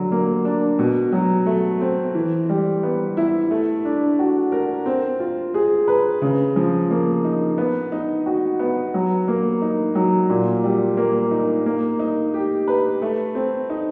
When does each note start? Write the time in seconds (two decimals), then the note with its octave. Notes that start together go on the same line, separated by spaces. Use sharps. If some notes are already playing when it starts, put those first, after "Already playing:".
Already playing: D3 F#3
0.12 A#3
0.45 D4
0.79 B2
1.12 F#3
1.46 A3
1.81 C4
2.15 E3
2.49 G3
2.83 B3
3.17 E4
3.51 A3
3.85 D4
4.19 F#4
4.52 A#4
4.86 C4
5.20 F4
5.54 G#4
5.88 B4
6.22 C#3
6.56 F3
6.91 A#3
7.25 D#4
7.58 B3
7.92 D#4
8.26 F#4
8.59 B3
8.94 F#3
9.28 A#3
9.62 D#4
9.95 F#3
10.30 A#2
10.64 G3
10.97 A#3
11.31 D#4
11.66 A#3
11.99 D#4
12.34 G4
12.68 B4
13.02 A3
13.35 C4
13.70 D#4